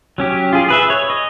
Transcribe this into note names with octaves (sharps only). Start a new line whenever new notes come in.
F#3 C#4 G4
F4 G#4
G#4 B4 E5
C#5
D#5